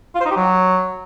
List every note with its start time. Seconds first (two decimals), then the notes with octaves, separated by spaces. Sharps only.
0.15 F4
0.21 C5
0.26 D#4
0.31 G4
0.36 F#3